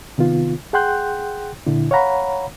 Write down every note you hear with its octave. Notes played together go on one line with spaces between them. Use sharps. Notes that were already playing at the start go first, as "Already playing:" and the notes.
C3 D#3 B3 F4
G#4 F#5 G5 C6 F#6 G6
A#2 D3 E4
C#5 F5 F#5 A#5 B5